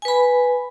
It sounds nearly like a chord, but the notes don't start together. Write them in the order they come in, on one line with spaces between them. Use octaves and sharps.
G#5 B4 B5